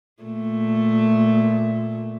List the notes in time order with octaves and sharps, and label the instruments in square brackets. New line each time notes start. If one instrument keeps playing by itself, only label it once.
[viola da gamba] A#2 A3